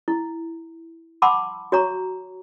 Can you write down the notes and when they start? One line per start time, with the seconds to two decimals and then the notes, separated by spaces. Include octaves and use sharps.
0.08 E4
1.22 F#5 A5 B5 C6 D6 E6
1.72 F#4 C#5 A#5 C#6